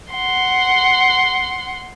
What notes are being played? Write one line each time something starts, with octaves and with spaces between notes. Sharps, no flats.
F#5 C6